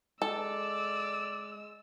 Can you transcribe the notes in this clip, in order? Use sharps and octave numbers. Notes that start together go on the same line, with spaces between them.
G#3 A4 D5 E6